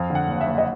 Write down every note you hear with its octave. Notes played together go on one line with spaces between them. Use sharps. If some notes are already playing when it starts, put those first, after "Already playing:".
Already playing: F2 F5
D3
F#5
F#1
E5
F#1
D#5